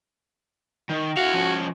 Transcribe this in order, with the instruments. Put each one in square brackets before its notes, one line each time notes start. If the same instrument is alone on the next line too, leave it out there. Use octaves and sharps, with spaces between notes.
[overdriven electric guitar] D#3
[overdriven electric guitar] E4 F5 [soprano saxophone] F#4
[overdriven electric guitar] F3 C#4